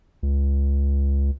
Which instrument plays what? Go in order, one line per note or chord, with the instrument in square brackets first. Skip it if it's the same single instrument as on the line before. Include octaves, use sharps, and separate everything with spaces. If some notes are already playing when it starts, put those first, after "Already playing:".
[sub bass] C#2